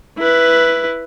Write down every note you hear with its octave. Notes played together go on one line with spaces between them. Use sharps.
E4 B4